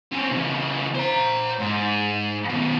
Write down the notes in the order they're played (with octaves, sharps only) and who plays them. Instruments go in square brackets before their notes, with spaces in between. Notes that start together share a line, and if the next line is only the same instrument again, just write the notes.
[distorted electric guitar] C4 C#4
C#3 E3
C5 A#5
G#2
B2 D#3